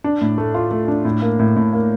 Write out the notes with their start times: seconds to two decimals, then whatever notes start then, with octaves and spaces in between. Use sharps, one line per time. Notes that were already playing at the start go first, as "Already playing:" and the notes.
0.04 D4
0.21 A2
0.38 A3
0.54 F4
0.71 A3
0.88 D4
1.05 A2
1.22 A#3
1.39 A2
1.56 A2
1.73 A#3